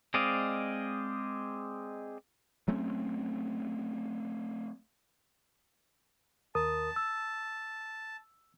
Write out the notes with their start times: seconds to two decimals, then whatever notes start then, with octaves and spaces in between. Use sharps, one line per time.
0.14 G#3 C4 D5 D#5 F5
2.68 F#3 A3 C4 C#4
6.55 D#2 A#4 A5 D#6
6.96 E6